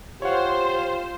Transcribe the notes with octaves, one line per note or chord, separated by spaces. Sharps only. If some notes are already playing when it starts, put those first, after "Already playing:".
F4 G4 C5 C#5 F#5